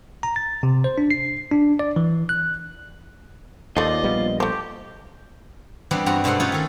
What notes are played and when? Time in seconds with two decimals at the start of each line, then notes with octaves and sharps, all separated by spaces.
0.23 A#5
0.36 A6
0.63 C3
0.84 C5
0.98 D4
1.11 C7
1.52 D4
1.79 D5
1.96 E3
2.29 F#6
3.77 D#2 F3 A3 F4 D5 D#5
4.04 A#1 G3 B3
4.40 A3 G4 C5
5.91 E3 G3 B3 C4 D4
6.06 G2 B3 C4 F#4 A#5
6.24 G2 B2 G#3 A3 C4 F#5
6.40 A3 C#4 D#4 F4 B4 C#5
6.52 D#3 A4